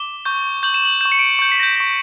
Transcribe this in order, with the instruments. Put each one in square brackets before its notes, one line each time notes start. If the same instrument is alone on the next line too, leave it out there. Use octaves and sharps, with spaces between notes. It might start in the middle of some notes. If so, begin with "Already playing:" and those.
Already playing: [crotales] D6 G7
C#6 G6
C#6 G6 F#7
E7
F#7
C#6 G6 E7
C#7
D7
C#6 G6 C#7
B6
A#6
G6
C#6 G6 A#6